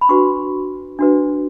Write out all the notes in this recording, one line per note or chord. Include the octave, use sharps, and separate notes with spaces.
B5
D4 F#4 B4 C#6
D4 F#4 B4